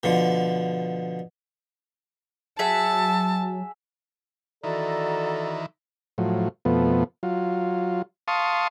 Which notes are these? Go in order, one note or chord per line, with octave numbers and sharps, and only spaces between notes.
B2 D3 F3
F#3 G#4 E5 F#5 A5
D#3 E3 F#4 A4 D5 A#5
A2 F3 F#3
F2 B2 F3 A3 B3
F#3 F4
F5 A5 C6 C#6 D#6